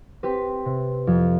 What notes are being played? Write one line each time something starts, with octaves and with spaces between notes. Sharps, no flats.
C4 G4 B4
C3
F2